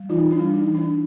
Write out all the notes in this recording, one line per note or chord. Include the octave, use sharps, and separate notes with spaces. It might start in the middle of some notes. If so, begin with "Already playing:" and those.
Already playing: G3
E3 D#4 F4
D4 E4
G3
D#4
E3
D4 E4